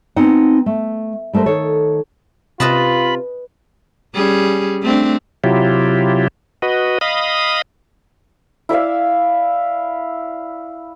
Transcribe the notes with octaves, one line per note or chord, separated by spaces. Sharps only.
B3 C4 D#4 F#5
A3
G3 A3 A#4 C5
D#3 A4 C#5
C3 F4 B4 D#5 A5 B5
G3 C#4 G#4
A3 C4 D4
C3 F#3 E4 F4 G4
F#4 B4 D#5
D#5 F5 B5 D#6
E4 D5 E5 F5